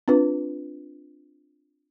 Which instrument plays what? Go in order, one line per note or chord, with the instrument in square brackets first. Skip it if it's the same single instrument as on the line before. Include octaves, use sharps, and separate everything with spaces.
[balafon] C4 D4 F4 B4